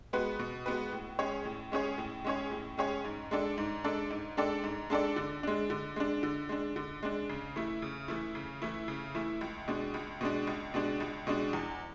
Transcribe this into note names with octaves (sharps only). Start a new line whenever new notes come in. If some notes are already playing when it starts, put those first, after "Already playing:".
G#3 B3 F#4 B4
B2
G#3 B3 F#4 B4
A2
G#3 C#4 G#4 C#5
A2
G#3 C#4 G#4 C#5
A2
G#3 C#4 G#4 C#5
A2
G#3 C#4 G#4 C#5
G#2
G#3 D4 A4 D5
G#2
G#3 D4 A4 D5
G#2
G#3 D4 A4 D5
G#2
G#3 D4 A4 D5
D3
G#3 D4
D3
G#3 D4
D3
G#3 D4
D3
G#3 D4
C#3
E3 A3 E4
C#3
E3 A3 E4
C#3
E3 A3 E4
C#3
E3 A3 E4
C#2
B2 G#3 D4
C#2
B2 G#3 D4
C#2
B2 G#3 D4
C#2
B2 G#3 D4
E2